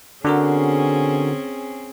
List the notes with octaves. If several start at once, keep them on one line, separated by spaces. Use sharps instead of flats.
D3 C4 C#4 F#4 G#4 A#4